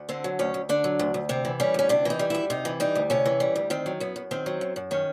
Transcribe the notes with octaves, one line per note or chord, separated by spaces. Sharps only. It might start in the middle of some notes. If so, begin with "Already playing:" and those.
Already playing: D2
D3 C4
F#3
D2 C#4
D2
D3 D4
F#3
D2
D2
C3 C4
E3
G3 C#4
D2 C#4
C3 D4
E3 D#4
G3
D2 E4
C3 D#4
E3
G3 D#4
D2
C3 C#4
E3
G3
D2
D#3 C4
F#3
F#2 B3
F#2
D#3 C4
F#3
F#2
F#2
D#3 C#4